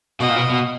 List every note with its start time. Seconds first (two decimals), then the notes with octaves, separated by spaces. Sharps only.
0.20 B2 D#5
0.28 A#2
0.36 B2
0.50 B2